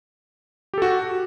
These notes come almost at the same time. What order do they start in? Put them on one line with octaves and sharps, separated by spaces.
G4 A4 F#4